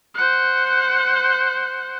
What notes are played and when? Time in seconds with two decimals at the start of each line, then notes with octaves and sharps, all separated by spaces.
0.14 C5 F#5